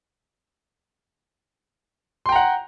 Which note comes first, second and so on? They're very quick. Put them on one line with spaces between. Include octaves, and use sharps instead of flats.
C6 G5 A#5 F#5